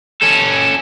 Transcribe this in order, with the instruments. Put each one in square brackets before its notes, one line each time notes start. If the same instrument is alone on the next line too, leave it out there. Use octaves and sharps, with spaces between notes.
[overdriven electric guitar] C#4 A4